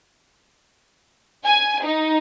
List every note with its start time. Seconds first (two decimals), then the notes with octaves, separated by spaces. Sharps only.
1.45 G#5
1.83 D#4